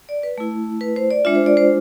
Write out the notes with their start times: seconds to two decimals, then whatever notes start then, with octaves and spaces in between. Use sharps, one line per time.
0.09 D5
0.23 B4
0.38 A3 E4
0.81 B4
0.96 C5
1.11 D5
1.25 G#3 D4 F4 E5
1.35 C5
1.46 D5
1.57 C5